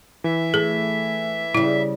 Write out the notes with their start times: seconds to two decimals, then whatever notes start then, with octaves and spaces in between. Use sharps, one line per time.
0.24 E3 E5
0.54 A3 G#4
1.55 C#3 G3 E4